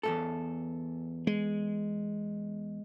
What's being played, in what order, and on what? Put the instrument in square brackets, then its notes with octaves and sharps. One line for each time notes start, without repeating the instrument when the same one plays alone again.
[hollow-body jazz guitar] E2 G#2 A4
[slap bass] G#3